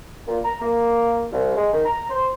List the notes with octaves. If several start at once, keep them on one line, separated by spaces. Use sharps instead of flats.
A#2
A#5
A#3
C2
G#3
D#3
A#5
C5